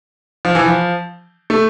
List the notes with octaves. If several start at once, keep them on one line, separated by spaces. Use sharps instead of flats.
F3
E3
F3
A3